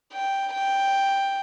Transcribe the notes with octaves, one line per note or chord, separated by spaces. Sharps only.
G5
G5